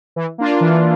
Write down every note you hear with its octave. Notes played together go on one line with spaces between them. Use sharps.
E3
A#3 D4 F4
E3